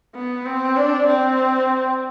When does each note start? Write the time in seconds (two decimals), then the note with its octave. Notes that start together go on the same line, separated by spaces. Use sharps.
0.15 B3
0.46 C4
0.77 D4
1.08 C4